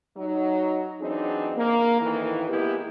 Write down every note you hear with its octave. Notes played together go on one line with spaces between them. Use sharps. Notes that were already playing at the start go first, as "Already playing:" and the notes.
F#3 D#4
E3 F#3 C4 D4 D#4 G#4
A#3
F2 A2 D#3 E3
G#3 A#3 B3 E4 G4